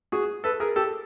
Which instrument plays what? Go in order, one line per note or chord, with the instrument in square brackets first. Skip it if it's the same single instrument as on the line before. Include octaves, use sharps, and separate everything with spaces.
[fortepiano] F#4 G#4
A4 B4
G#4 A#4
G4 A4